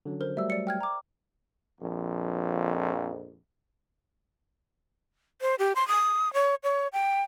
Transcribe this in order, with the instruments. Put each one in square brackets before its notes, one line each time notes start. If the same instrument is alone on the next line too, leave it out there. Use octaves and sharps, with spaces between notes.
[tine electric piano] D3 F#3 C#4
[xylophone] A#4 C5
[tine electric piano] F#3 G3 A3 [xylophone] E5 E6
[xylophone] D5 C#7
G5 F6 G#6
A#5 D6
[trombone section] A#1 F2
[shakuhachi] C5
G4
C6
D#6
C#5
C#5
G5